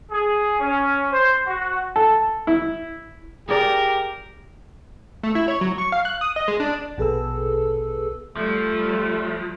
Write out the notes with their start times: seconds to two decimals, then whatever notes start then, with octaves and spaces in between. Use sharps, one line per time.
0.11 G#4
0.60 C#4
1.11 C5
1.47 F#4
1.96 A4
2.47 E4
3.49 G4 G#4 A#4 D5
5.23 A3
5.35 E4
5.48 C#5
5.61 F#3
5.78 C#6
5.92 F5
6.05 F#6
6.21 D#6
6.36 D#5
6.48 G#3
6.60 D4
6.98 A#1 B2 G#4 A4 B4 E6
8.36 F3 G3 A3